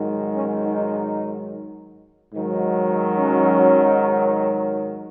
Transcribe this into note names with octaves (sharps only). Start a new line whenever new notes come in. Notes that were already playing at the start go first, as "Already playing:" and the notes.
Already playing: G#2 D#3 F#3
C#4
D#4
G#2 D#3 F#3
C#4